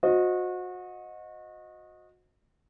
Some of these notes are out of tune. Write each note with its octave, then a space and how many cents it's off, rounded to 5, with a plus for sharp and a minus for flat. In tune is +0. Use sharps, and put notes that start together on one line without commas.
F#4 -30 C5 +0 D#5 +0